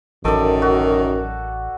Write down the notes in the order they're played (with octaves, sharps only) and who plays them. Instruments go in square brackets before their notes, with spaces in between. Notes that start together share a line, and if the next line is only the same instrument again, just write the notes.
[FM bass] A1 [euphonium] F#2 [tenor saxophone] D#3 [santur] A4 D5
[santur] F#4